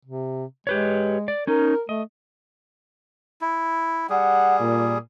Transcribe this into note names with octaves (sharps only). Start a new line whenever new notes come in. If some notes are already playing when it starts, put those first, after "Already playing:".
C3
G#3 G4 B4 C#5
D5
C#4 D#4 A#4
A3 D#5
E4
G3 G#4 F#5
A#2